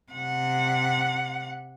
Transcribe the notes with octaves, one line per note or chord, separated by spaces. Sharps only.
C3 F#5